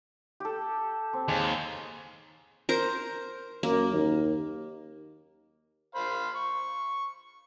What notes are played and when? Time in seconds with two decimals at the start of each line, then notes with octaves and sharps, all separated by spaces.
0.40 G4 A4
1.13 C4
1.28 D#2 G#3
2.69 A#4 C5 A#5
3.63 F#2 A#3
3.93 D#2
5.95 C5 F5 B5
6.35 C#6